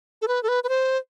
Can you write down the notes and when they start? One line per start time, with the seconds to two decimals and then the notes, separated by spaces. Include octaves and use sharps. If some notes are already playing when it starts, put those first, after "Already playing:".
0.22 A4
0.28 B4
0.43 A4
0.48 B4
0.64 B4
0.69 C5